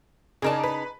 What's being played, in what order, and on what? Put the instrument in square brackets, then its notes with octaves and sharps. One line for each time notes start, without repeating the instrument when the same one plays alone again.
[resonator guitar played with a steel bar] C#3 D#4 A5 [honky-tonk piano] G#4 A#4 D5
[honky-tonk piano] B4